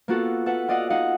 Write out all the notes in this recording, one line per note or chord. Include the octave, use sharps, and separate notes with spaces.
A#3 B3 F4 F#4 A4
A4 B4 E5 F#5
F4 D5 D#5 F5 F#5
D#4 D#5 F5 F#5